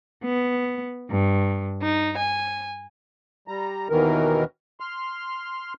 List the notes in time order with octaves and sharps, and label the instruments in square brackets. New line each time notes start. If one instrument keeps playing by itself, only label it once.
[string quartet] B3
G2
D#4
G#5
[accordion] G3 A#5
D#2 B2 D#3 E3 A#4
C6 F6